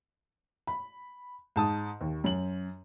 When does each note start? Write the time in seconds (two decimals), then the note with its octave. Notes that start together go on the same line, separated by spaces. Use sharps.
0.67 B5
1.56 G#2 A5 D#6
2.01 D#2
2.24 F#2 F#7